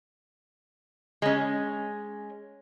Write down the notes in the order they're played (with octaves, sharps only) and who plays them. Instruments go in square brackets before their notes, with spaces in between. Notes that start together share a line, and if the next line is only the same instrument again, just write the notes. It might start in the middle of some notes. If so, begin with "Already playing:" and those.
[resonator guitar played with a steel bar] G#3 C#4